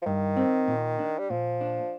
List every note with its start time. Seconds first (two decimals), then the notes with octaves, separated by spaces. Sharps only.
0.02 F3
0.06 G2 D#3
0.37 C4
0.68 A#2
0.99 D4
1.18 G3
1.30 A#2 F3
1.61 D4